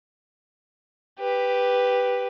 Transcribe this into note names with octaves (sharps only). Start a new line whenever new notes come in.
G4 B4